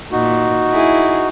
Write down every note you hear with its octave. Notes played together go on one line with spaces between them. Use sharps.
A#2 D#4 F#4
E4 G#4